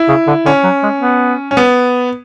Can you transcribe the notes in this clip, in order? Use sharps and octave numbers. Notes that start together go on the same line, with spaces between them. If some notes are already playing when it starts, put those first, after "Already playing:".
Already playing: E4
C#3
D3
D3 C#4
F#3
G#3
B3
C#4
B3